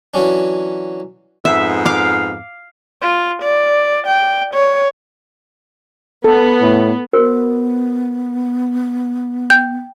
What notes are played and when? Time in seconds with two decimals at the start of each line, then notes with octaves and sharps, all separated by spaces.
0.14 E3 F#3 C#4 D4
1.45 F2 G#2 B3 E5
1.85 F5 D6
3.02 F4
3.42 D5
4.07 G5
4.54 C#5
6.24 B3 A4
6.62 A2
7.13 B3 F#4 A#4 C5
9.50 G5 G6